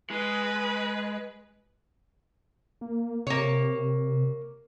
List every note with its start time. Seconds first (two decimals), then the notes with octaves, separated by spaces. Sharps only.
0.10 G#3 B4
2.81 A#3
3.27 C3 A#3 C#5